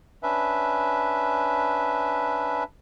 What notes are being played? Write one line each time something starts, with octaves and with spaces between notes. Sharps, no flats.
C#4 D4 B4 E5